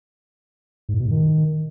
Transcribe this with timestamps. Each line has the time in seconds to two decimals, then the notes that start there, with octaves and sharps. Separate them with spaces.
0.89 G#2
0.94 A2
1.00 B2
1.05 G#2
1.11 D#3